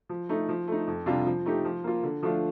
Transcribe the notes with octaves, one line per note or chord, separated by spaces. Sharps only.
F3
A3 D#4
F3
A3 D#4
F2
C3 G3 D4 F4
F3
A3 D#4 G4
F3
A#3 F4
D3
F3 A3 D4 F4